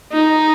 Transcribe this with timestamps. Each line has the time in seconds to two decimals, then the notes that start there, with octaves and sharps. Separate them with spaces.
0.12 D#4